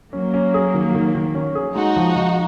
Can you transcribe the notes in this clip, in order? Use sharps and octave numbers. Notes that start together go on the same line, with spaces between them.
F#3 A#3 C#4
C#4
G#4
D#3
D#3
D#3
C#4
G#4
G#3 D#4 F#4
F3
F3